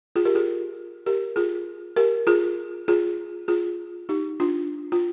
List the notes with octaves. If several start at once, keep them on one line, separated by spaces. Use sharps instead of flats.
F4 G#4
G4 A#4
F4 G#4
G4 A#4
F4 G#4
G4 A#4
F4 G#4
F4 G#4
F4 G#4
D#4 G4
D4 F4
F4